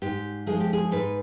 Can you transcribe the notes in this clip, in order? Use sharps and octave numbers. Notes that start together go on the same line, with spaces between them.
G#2 G4
F3 G#3 G#4
G4
G#4
G#2 B4